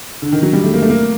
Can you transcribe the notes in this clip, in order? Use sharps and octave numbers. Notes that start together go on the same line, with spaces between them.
D3
D#3
F#3
G3
A3
A#3
A3
A#3